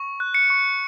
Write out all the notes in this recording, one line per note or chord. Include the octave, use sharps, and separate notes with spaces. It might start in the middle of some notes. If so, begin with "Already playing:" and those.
Already playing: C#6
F#6
C#7
C#6